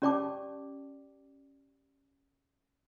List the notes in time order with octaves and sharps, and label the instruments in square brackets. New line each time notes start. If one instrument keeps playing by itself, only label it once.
[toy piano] C#4 G4 D5 G5 A5 D6